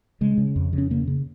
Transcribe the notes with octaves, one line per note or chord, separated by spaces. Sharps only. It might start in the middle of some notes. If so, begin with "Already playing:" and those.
C#3 G#3
C#3
F2
C#3
C#4
C#3 A#3
C#3